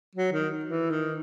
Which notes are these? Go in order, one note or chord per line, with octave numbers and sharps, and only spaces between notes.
F#3
D#3
E3
D#3